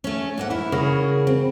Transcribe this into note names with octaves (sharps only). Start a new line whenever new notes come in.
A3 C#4
G#2 A#3 F#5
E4 A#4
C#3 E4 F#4 G#4 A#4
C4